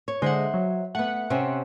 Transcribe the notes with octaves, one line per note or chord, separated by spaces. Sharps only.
C#5
D3 G#3 C5 E5 F#5
F#3
A3 B3 F#5
C3 C4 C#4